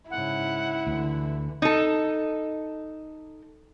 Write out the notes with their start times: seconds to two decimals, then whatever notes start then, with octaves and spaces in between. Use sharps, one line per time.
0.10 G#2 C#3 E4 F#5
0.87 D2 D3 E3
1.62 D#4 A4